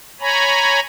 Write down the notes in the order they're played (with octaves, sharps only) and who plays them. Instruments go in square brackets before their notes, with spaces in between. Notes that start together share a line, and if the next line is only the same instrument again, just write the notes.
[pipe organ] C#5 G#5 A#5 B5